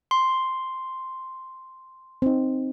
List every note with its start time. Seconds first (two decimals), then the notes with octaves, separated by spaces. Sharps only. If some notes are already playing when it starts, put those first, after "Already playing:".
0.11 C6
2.22 C4 D#4